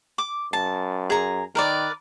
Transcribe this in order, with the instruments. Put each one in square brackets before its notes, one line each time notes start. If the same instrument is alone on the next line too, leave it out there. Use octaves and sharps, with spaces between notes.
[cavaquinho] D6
[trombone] F#2 [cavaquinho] A5
[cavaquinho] G#4 A#5
[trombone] D#3 [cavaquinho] A#4 B4 D5